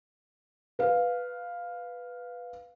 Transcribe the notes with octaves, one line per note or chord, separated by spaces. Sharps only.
B4 F5